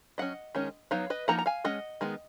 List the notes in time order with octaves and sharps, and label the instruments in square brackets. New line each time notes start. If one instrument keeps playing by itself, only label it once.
[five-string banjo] F#3 C#4 D#5 F#5
D#3 G#3 C#4
F#3 B3 D#4 C#5 F5
B4 D#5
F3 A#3 D#4 F#5 A#5
A#5
F5 G#5
G#3 C#4 D#5 F#5
D#3 G#3 B3